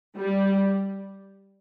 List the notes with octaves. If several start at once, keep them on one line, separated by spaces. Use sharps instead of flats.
G3